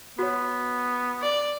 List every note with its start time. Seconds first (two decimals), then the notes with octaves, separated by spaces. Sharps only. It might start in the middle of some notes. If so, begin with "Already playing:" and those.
0.19 B3 F#4 C#5
1.23 D5